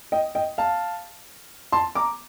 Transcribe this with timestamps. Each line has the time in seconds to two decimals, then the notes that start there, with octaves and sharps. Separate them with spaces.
0.12 D#5 G5
0.35 D#5 G5
0.58 F5 A5
1.72 A5 C6
1.95 A#5 D6